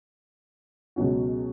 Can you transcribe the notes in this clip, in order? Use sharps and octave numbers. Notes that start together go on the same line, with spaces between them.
C#2 B2 F#3 C#4 F#4